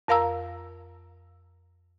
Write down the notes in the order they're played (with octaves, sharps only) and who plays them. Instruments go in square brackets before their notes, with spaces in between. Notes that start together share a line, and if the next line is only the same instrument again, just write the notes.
[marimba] F2 A#4 F5 A#5 E6